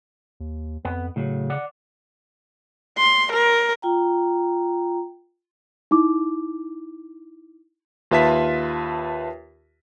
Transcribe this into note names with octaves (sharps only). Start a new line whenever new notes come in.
D#2
F2 B3
A2 C#3 F#3
D5 F#5
C6
A#4
F4 G5 A#5
D#4 E4 D6
D#2 F4 B4 E5 A5 B6